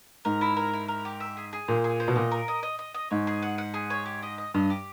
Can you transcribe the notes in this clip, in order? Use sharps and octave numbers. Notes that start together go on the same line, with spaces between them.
G#2 A#4
E4
A#4
E4
A#4
G4
E5
G#4
G#4
A#2 C5
G#4
C5
B2
A#2 D#5
A#4
D#5
D#5
D#5
D#5
G#2 C#5
G#4
F#5
F#5
G#4
C#5
G4
D#5
D#5
G2 D#5
G4